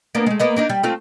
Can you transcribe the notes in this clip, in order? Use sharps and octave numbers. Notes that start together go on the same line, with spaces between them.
A#3 B3 D4
G#3 A3
A#3 B3 D#5
A#3 D4 D#4
G3
A3 C4 F4